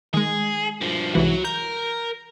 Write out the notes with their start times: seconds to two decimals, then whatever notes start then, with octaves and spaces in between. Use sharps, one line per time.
0.14 D#3 G#3 G#4
0.81 G2 F3
1.15 C2 G#2 E3 F#4 C#5
1.44 A#4 A#5 G6